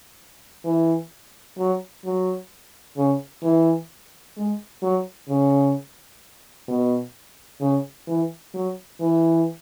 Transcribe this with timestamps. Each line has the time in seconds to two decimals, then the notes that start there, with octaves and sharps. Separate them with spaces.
0.65 E3
1.58 F#3
2.05 F#3
2.97 C#3
3.43 E3
4.37 G#3
4.83 F#3
5.29 C#3
6.68 B2
7.61 C#3
8.08 E3
8.54 F#3
9.01 E3